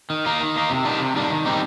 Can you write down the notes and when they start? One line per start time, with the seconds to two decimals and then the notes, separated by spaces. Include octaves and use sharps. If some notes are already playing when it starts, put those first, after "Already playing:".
0.10 D#3
0.26 A#3 D#4
0.40 D#3
0.56 A#3 D#4
0.70 C3
0.85 D#3 G3 D4
1.00 C3
1.16 D#3 G3 D4
1.30 D#3
1.45 G3 C4 D#4 G4